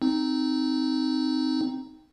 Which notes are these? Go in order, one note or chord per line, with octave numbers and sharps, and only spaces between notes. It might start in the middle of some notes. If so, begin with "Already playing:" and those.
C4 D#4